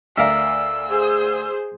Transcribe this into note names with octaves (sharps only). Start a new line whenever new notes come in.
D2 A#4 D5 E5 F5 E6
G#4 C5